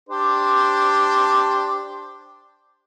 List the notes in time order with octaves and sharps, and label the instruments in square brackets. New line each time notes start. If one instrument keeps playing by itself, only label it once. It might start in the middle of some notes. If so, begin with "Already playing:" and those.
[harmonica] D4 G4 C5